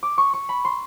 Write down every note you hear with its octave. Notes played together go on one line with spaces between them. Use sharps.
D6
C#6
C#6
B5
C6